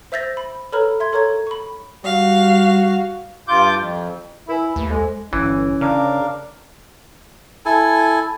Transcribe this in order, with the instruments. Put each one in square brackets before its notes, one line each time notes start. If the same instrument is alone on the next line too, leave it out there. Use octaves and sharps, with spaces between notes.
[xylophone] C5 E5 E6 G6 A6 A#6
B5
A4 B4 C#5 A#5 B5 F6
E5 C6 G#6
A4 A#4 C#5 A#5 C#6 G#6
B5 C#6
[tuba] G3 [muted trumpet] F#4 [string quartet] F5
[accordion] G2 F4 D6 G6
F2
[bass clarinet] E4 [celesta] A#4 B4 G#5
[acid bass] D#2 [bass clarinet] A3
[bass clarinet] G#3 [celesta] A4 C5 D#5
[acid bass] G1 [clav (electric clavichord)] E3 [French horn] C#4
[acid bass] C#3 [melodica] D4 A#4 F5
[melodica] E4 A4 G#5